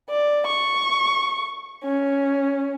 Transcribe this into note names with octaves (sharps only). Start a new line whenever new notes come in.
D5
C#6
C#4